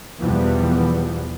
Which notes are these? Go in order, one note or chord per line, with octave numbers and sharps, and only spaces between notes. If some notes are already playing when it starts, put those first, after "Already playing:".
E2 B2 E3 F3 G3 B3